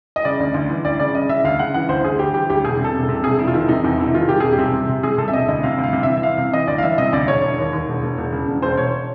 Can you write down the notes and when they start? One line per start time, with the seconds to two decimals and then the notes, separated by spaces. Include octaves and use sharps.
0.16 D#5
0.25 C#3 D5
0.40 D2
0.54 D2
0.69 E3
0.85 D2 D5
1.00 C#3 D5
1.15 C#3 D#5
1.29 C#3 E5
1.44 D2 F5
1.59 C#3 F#5
1.74 E3 F#5
1.89 D2 C5
2.04 D2 G#4
2.19 D2 G4
2.34 E3 G4
2.50 D2 G4
2.64 E1 G#4
2.79 C3
2.84 A4
2.95 E1
3.04 C3 A4
3.24 E1 G#4
3.39 E1 E4
3.47 F4
3.54 D#3 E4
3.68 C3 D#4
3.84 E2 D#4
3.99 E1 E4
4.13 D#3 F4
4.29 C3 G4
4.40 E1 G#4
4.53 G4
4.58 C3
4.74 C3
4.89 C3
5.03 C3 G#4
5.18 C3 A4
5.28 E5
5.33 E1 D#5
5.48 D2 D#5
5.63 C3 F5
5.78 D2
5.84 F5
5.93 C3
6.03 E5
6.08 E3
6.17 E5
6.23 E3 F5
6.38 C3 F5
6.53 E3 D#5
6.68 D2 D5
6.78 F5
6.83 E3 E5
6.98 C3 D#5
7.13 D2 D5
7.28 E1 C#5
7.43 E1
7.58 D#2
7.73 D#2
7.88 E1
8.02 E1
8.18 E1
8.32 C#3
8.48 E1
8.62 E1 C5
8.77 E1 C#5